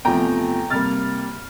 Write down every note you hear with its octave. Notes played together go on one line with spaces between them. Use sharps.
E2 C3 F3 A3 G5 A#5
C3 G3 A#3 F6 A6